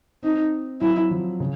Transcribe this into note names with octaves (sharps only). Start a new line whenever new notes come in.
C4 D#4
F#3 E4
F3
C#3